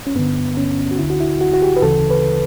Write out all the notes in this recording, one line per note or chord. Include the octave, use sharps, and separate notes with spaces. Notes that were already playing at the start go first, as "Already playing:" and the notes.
C#4
G2 D3 B3
C#4
F#4
D2 D3 E4
F#4
E4
F#4
F#4
G4
B4
D2 C#3 E3 A4
B4